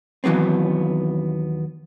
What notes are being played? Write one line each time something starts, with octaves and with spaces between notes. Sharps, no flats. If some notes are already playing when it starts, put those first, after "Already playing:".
D#2 E3 F#3 B3 C4